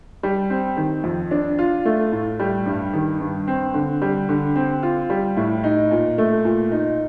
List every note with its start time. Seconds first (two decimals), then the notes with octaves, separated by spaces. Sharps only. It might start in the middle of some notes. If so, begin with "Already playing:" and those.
0.23 G3
0.50 C4
0.77 D#3
1.04 F2
1.31 D4
1.59 F4
1.85 A3
2.12 A2
2.39 G3
2.66 G2
2.93 D#3
3.20 G2
3.48 C4
3.74 D3
4.02 G3
4.29 D3
4.56 C4
4.83 F4
5.10 G3
5.37 A2
5.64 D#4
5.91 A#2
6.18 A3
6.45 A#2
6.72 D#4